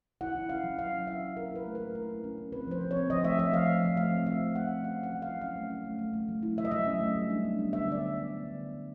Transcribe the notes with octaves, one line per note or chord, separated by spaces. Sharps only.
E4 F#5
E4
C#4 F5
F#3
C#4 F5
C#4
E4 E5
C#4
E4 A#4
E4 B4
A3
A#4
E4
E4 A#4
E4
C#4
C#4
C4 B4
F3 C5
C4
C#5
C4
F3 D#5
A3 E5
F3 E5
F3 F5
F3
F3
A3 F5
C4
C4 E5
F3
A3 F#5
C4
C#4 F5
A3
F#5
F#3
E4 F5
C#4 F5
A3
C#4
A3
A3
A3
F#3
E4
F#3 E5
D#5
F#3 E5
C#4
A3
G3
D4
B3
G3
D3 E5
D4 D5
B3
B3
G3
D3
B3
D3